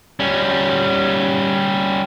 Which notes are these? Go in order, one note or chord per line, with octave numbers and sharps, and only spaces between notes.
G3 C#4